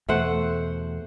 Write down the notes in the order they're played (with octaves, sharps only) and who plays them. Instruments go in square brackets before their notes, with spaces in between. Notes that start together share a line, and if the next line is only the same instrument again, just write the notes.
[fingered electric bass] E2 B2 [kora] A3 C5 F#5